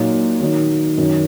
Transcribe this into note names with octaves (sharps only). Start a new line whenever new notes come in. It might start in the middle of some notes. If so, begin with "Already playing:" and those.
Already playing: A#2 F#3 D#4
D#3 F#3 D#4
F#2 D#3 F#3